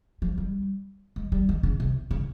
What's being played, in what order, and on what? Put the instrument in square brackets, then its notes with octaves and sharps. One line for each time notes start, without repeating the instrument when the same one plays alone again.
[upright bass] F3
G3
G#3
G3
D#3
C#3
C3
C#3